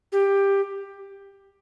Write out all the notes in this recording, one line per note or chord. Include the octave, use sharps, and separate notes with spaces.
G4